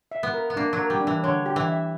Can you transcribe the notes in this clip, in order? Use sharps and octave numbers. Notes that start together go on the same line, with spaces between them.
E5
B3
A#4
B3
A#3 D4
F#3
A#4
G3
D4
E3
D3 C#5
G4
E3
E5